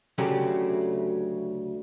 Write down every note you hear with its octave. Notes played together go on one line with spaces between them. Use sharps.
D2 C#3 F#3 A3 G4